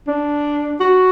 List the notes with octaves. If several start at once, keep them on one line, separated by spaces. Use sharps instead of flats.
D4
F#4